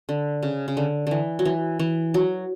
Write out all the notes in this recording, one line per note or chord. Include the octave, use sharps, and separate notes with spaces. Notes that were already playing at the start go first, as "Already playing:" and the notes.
D3
C#3
C#3
D3
D3 E3
F#3
E3
E3
F#3